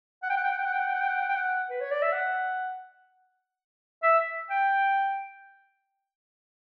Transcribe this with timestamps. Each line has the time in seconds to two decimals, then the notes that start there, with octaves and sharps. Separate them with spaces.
0.23 F#5
0.30 G5
0.37 F#5
0.44 G5
0.51 F#5
0.58 G5
0.65 F#5
0.73 G5
0.80 F#5
0.86 G5
0.94 F#5
1.00 G5
1.08 F#5
1.15 G5
1.22 F#5
1.29 G5
1.36 F#5
1.70 B4
1.81 C#5
1.91 D5
2.02 E5
2.13 F#5
4.03 E5
4.50 G5